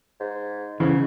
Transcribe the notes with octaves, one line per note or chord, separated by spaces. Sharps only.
G#2
G#2 C#3 E3